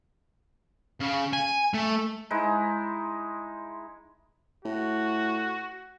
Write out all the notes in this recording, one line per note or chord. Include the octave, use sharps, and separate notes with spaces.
C#3
G#5
A3
G#3 D#4 E4
A2 F#4